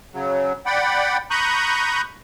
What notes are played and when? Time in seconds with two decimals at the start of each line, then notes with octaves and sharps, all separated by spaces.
0.13 C#3 F#3
0.66 D5 F#5 G5 B5
1.30 A#5 B5 C#6 D#6 F#6 G6